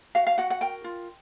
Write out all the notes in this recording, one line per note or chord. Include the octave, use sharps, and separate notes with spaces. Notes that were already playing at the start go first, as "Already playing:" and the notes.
F#4 F5
F5
F#4 F#5
F#5
A#4 G5
F4